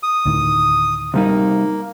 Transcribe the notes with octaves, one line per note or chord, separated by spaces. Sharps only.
D#6
D2 A2 D#3
C3 G3 A#3 D#4